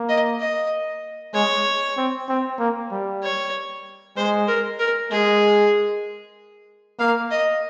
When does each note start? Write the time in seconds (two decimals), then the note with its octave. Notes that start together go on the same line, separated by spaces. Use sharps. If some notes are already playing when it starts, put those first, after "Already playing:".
Already playing: A#3
0.09 D#5
0.40 D#5
1.34 G#3 C#5
1.97 C4
2.29 C4
2.59 A#3
2.92 G3
3.23 C#5
4.17 G#3 C5
4.48 A#4
4.79 A#4
5.11 G#3 G#4
6.99 A#3 F5
7.31 D#5